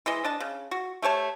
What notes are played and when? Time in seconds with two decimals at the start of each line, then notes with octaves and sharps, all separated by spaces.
0.06 E3 G#3 D#5
0.24 D4 D#5 A5
0.40 C#3
0.71 F#4
1.02 A3 G4 C#5 A5